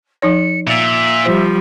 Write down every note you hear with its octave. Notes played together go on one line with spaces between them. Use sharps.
F3 D#4 C#5 C#7
A#2 E5
F3 G3 C5